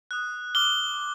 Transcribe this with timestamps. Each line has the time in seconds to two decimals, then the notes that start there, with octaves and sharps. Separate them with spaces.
0.11 D#6 F#6
0.55 D6 F6 G7